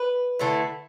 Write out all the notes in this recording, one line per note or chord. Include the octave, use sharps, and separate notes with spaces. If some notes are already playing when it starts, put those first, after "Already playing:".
Already playing: B4
D3 A3 E4